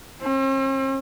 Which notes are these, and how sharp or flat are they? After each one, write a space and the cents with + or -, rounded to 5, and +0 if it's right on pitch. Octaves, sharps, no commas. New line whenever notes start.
C4 +45